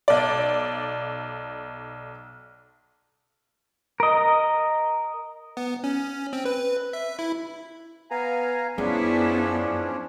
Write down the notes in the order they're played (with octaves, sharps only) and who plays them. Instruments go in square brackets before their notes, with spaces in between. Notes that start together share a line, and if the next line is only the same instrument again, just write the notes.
[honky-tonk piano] B1 D5
[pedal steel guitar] A#4 D#5
[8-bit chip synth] B3
C#4
C4
B4
E5
E4
[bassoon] B3 [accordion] F5 G#5 A#5
[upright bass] F#2 [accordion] F3 C#4 D4 [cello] B3 E4 [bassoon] G#4